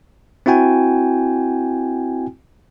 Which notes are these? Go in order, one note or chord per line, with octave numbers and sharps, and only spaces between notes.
C4 E4 F#4 G5 G#5